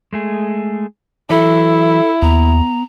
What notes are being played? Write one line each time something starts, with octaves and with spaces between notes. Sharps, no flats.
G#3 A3 G#4
E3 F#3 E4 A4 E5
D#2 B3 A#5